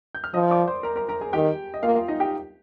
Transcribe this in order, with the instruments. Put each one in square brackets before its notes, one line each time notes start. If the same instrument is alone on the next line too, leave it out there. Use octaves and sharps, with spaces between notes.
[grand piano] G6
F6
[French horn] F3 [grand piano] D#5 D#6
[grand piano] D5 D6
C5 C6
A#4 A#5
A#4 A#5
A#4 A#5
G#4 G#5
[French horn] D#3 [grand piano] G4 G5
[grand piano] D#5
[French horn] A#3 [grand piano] F4 F5
[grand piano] F4 F5
D#4 D#5
G4 G5